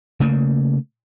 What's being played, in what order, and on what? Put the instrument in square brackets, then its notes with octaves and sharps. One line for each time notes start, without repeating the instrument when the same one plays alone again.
[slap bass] C#3 A3 A#3